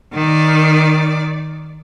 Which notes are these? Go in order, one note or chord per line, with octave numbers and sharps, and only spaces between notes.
D#3 D5